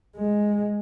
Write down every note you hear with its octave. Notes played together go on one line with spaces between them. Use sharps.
G#3